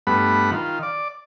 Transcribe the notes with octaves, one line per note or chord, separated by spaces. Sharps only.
G2 A3 B3 F#5 B5
D#3 F4
D5